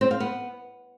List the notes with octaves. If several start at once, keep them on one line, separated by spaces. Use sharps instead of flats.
C4
F5
B3